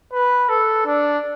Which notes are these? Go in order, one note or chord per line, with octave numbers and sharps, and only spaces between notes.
B4
A4
D4